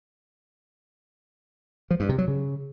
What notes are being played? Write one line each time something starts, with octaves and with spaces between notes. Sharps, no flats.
F3
G2
C3
F#3
C#3